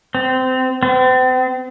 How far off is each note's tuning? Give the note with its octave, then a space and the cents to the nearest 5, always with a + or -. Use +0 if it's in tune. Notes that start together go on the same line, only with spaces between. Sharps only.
C4 -20
C4 -40